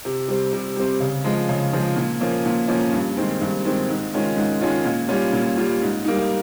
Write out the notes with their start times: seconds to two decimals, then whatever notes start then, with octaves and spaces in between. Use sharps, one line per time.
0.05 C3
0.28 G3 C4
0.53 C3
0.76 G3 C4
1.00 C#3
1.24 F3 G#3
1.49 C#3
1.73 F3 G#3
1.96 A#2
2.21 F3 A#3 C#4
2.45 A#2
2.68 F3 A#3 C#4
2.93 G2
3.17 D#3 G#3 C4
3.41 G2
3.65 D#3 G#3 C4
3.89 G#2
4.14 D#3 G#3 C#4 F4
4.37 G#2
4.61 D#3 G#3 C#4 F4
4.85 A#2
5.09 G3 C#4 F4
5.33 A#2
5.57 G3 C#4 F4
5.81 G#2
6.05 G3 A#3 D#4